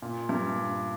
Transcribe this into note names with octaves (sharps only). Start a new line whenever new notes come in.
A#2
G2